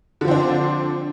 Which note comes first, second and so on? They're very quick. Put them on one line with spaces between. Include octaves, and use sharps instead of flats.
D3 F3 C4 D4